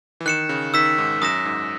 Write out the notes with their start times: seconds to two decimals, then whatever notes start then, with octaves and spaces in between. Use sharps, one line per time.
0.21 E3
0.26 D#3 F#6 C#7 E7
0.49 C#3
0.74 D#3 E6 B6 E7
0.98 G#2
1.22 F#2 D#6 A#6 E7
1.45 G#2